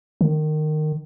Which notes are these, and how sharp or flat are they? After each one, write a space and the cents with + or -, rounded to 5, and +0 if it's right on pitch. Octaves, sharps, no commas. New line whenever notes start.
D#3 -20